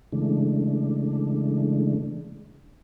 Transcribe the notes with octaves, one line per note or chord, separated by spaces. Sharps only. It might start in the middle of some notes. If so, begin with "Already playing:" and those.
C#3 E3 G#3 A3 D4